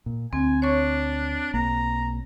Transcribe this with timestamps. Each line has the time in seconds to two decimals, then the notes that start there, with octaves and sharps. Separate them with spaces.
0.06 A#2
0.33 D2 C4 G#5
0.62 D4 C#5 C#6
1.54 B1 A#3 A#5